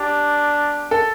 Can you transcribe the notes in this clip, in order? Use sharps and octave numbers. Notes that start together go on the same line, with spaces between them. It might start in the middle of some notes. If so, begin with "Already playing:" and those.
Already playing: D4 G4
A4